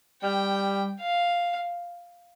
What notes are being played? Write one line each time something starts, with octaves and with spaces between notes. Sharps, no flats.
G3 G5
F5